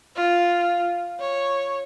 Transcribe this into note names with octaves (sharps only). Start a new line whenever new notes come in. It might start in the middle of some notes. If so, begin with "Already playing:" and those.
F4
C#5